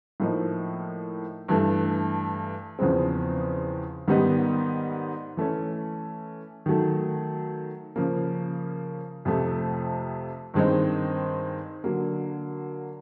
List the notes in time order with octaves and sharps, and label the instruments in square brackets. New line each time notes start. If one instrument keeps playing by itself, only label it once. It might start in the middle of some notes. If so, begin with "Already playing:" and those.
[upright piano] A2 F3 A#3 D#4
G2 E3 A3
E2 C#3 F3 G#3 C4
G#2 D#3 G3 B3 D#4
E3 A3 C#4
D#3 F#3 A3
C#3 F3 A#3
F2 C3 F3 A3
G2 D#3 G#3 C4 D#4
D3 F#3 A#3